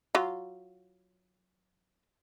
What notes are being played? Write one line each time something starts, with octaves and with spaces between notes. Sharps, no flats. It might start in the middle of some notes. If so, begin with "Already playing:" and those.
F#3 F4